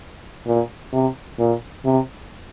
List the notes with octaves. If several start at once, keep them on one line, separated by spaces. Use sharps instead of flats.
A#2
C3
A#2
C3